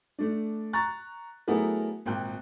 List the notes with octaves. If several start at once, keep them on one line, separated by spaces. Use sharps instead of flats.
A3 D4
A#5 C#6 F#6 A6
F#3 A3 B3 E4 G#4 A#4
G#1 A#2 G5 F#6